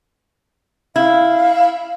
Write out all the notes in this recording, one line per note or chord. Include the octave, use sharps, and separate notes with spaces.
E4 F5